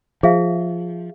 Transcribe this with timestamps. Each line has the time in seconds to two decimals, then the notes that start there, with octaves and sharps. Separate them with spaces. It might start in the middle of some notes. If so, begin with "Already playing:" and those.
0.23 F3 G#4 E5 F5